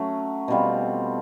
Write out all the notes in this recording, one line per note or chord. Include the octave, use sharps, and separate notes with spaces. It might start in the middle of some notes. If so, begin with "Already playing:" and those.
Already playing: F#3 A3 C#4
B2 G3 C4 F4